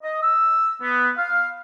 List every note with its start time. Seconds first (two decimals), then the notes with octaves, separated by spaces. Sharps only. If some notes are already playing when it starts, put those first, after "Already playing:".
0.03 D#5
0.22 E6
0.81 B3
1.17 F5